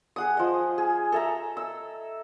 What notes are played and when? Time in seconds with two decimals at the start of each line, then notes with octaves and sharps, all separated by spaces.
0.16 G#4 F#5 D#6
0.37 F3 D#5
0.78 G#4
1.12 A4 E5 A#5
1.57 E6